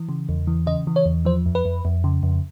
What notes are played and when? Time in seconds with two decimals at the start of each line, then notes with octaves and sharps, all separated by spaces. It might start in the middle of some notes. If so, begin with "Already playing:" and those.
Already playing: E3
0.09 C#3
0.29 E2
0.47 E3
0.67 C#3 D#5
0.87 E3
0.96 C#5
1.06 E2
1.25 F3 C5
1.46 F2
1.55 B4
1.65 F2
1.85 F2
2.04 C#3
2.23 F2